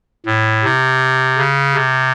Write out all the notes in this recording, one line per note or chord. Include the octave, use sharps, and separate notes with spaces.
A2
C3
C#3
C3